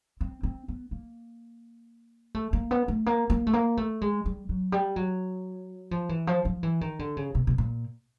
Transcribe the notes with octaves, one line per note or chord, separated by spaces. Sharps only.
C4
C4
B3
A#3
A3
A#3
B3
A3
A#3
A#3
A3
A#3
A3
G#3
G3
F#3
G3
F#3
F3
E3
F3
F3
E3
D#3
D3
C#3
B2
B2
A#2